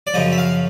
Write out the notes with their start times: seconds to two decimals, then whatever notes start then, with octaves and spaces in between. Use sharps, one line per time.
0.07 D5
0.14 F#2 C#3 F3 D#5
0.32 E5
0.38 F5